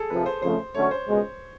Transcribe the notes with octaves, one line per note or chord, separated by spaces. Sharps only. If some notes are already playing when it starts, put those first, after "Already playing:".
Already playing: G#4 A4
F2 C3 F3 B4
C5
F2 C#3 F3 A3 C5
D3 F#3 A3 C#4 F#4 C#5
C5
C#2 B2 G#3